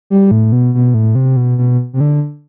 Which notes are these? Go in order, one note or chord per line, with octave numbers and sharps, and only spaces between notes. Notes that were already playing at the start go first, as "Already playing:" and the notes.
G3
A2
B2
B2
A2
C3
B2
B2
C3
D3